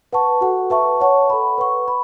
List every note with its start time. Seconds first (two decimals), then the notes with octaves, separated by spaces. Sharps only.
0.13 B4 F#5 A5 C#6
0.41 F#4 A4 F#5
0.70 B4 E5 A5 C#6
1.00 C#5 F#5 A5 C#6
1.30 A4 F#5 B5
1.58 B4 F#5 C#6
1.88 B5